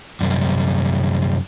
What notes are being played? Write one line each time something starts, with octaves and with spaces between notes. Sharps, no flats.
C2 F#2